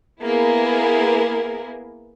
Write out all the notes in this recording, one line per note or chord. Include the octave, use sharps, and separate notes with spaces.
A#3 B3 E4 G#4 A#4